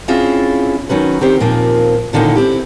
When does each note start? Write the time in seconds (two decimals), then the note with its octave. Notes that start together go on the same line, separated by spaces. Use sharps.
0.08 C4 C#4 E4 F4 G#4 E5
0.89 D#3 F#3 C#4 B4
1.21 D#3 C4 G4 C5
1.40 D#2 A#2 F3 A#3 C4
2.13 A#2 D3 D#3 C#4 D#4 E4
2.36 C4 E4 G4